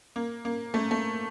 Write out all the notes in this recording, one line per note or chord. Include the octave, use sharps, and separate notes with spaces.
A#3
A#3
A3
A3